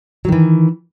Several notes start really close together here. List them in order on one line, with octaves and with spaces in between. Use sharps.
F#3 D#3 E3